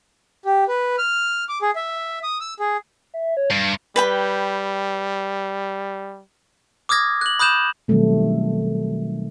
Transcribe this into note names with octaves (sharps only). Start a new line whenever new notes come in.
G4
B4
F6
D6
G#4
E5
D#6
E6
G#4
E5
C#5
G2 C7
G3 B4 G5 B5
D6 D#6 F6 G#6 A#6
F#6 F#7
B5 D#6 F#6 G6 E7 F7
B2 D#3 F#3 G3 A3 C4